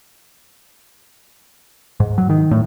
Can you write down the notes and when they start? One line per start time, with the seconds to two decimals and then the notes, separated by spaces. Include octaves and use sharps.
2.00 G#2
2.18 F#3
2.30 D#3
2.51 A2